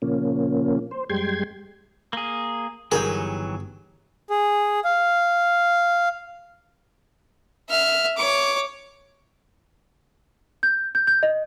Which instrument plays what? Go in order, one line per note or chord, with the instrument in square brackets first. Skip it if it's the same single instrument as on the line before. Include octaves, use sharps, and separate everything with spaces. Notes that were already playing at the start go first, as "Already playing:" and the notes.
[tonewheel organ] A#2 C#3 F3 A#3 C#4
C5
F#2 G3 G#3 G5 C6 G#6
[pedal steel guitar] A#3 G#4
[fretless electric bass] G1 [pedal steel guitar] D#3 E3 F#3 [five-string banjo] G4 A#4 [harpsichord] G#4
[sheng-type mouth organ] G#4
F5
[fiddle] E5 F6
C#5 D6
[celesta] G6
G6
G6
D#5